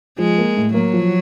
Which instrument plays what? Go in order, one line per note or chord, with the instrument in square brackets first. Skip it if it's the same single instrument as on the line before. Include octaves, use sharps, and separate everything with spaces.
[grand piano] F3 [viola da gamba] G#3
[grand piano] A#3
A2
[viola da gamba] F#3 [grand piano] A#3
[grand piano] F3